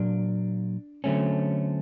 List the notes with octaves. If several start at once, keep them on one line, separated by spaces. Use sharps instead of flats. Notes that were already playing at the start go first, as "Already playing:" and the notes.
Already playing: A#2 F#3 A#3 D4
D3 F#3 A3 C4 C#4